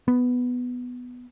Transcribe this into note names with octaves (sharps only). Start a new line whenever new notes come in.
B3